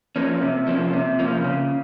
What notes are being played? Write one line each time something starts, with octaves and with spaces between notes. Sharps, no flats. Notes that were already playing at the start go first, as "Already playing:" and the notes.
F3 A#3 C#4
C3
F3 A#3 C#4
C3
F3 A#3 C#4
C#3